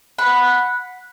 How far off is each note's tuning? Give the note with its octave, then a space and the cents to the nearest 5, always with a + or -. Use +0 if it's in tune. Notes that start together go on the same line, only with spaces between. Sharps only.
F#5 -10 B5 +0